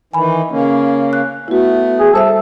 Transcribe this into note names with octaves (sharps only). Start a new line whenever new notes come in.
D#3 E3 G#5 B5
C#3 A#3 C#4
F#6
A3 B3 E4 F#4
G#4
G3 A4 C5 E5